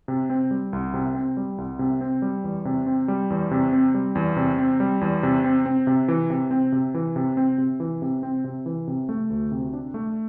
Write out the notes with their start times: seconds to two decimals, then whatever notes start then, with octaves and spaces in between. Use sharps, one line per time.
0.08 C3
0.30 C4
0.51 G3
0.73 C2
0.93 C3
1.15 C4
1.37 G3
1.58 C2
1.79 C3
2.01 C4
2.22 G3
2.44 E2
2.65 C3
2.86 C4
3.08 G3
3.30 E2
3.51 C3
3.73 C4
3.94 G3
4.15 E2
4.37 C3
4.58 C4
4.80 G3
5.01 E2
5.23 C3
5.44 C4
5.66 C4
5.87 C3
6.08 E3
6.30 C3
6.51 C4
6.72 C3
6.94 E3
7.16 C3
7.37 C4
7.58 C3
7.80 E3
8.02 C3
8.23 C4
8.44 C3
8.66 E3
8.88 C3
9.09 A3
9.30 D2
9.52 C3
9.73 D4
9.94 A3